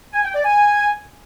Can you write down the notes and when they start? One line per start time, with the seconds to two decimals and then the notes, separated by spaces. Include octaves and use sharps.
0.14 G#5
0.24 G5
0.34 D5
0.45 G#5